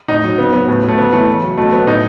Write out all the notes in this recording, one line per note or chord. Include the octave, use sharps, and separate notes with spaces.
A2 D#4
F#3
C#3 B3
F#3 B3
A2
F#3
A3
C#3 B3
E3 A3
C#3
F#3
B2 A3
F#3 B3
A2 D#4